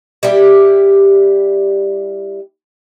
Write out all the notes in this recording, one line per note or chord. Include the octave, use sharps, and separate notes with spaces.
G3 E4 G4